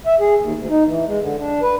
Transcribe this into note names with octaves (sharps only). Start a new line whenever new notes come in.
E5
G#4
D#2
D2
D#4
E3
G#3
D3
D4
B4